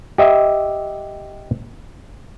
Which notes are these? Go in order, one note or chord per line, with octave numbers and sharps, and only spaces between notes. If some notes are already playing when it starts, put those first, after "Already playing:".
G4 D#5 E5